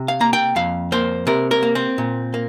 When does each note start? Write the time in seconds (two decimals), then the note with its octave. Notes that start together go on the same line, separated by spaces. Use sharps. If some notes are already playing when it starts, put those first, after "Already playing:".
Already playing: C3
0.08 F5
0.21 A#3 A#5
0.33 G5
0.56 F2 F5
0.92 A#3 C5
1.27 C3 A#4
1.51 A#4
1.63 A#3
1.75 C4
1.98 A#2
2.34 A#3